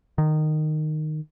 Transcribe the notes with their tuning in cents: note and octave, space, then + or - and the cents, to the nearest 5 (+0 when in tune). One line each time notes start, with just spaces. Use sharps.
D#3 -15